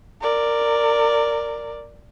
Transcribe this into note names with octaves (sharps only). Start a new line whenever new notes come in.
A#4 D5